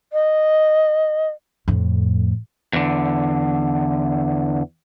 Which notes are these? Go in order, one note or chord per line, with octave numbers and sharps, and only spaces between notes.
D#5
F2 A2
E2 D3